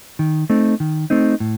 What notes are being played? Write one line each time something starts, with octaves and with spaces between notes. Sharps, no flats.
D#3
A3 C4 D#4
D#3
A3 C4 D#4
A2